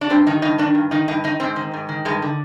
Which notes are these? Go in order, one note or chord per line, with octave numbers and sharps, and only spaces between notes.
D4
G2 C4
D#3 D#4
G2 D#4
D#3 D4
G2
D#3 D#4
G2 D#4
D#3 D#4
G#2 C4
D#3
G#2
D#3
G2 G#3
D3